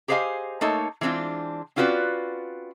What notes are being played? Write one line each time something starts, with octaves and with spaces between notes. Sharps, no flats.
G4 G#4 C5 D#5 F5 G#5
A3 A#3 D#4 A4 C#5
E3 G#3 C4 D4 F4
C4 C#4 F4 F#4 B4 D5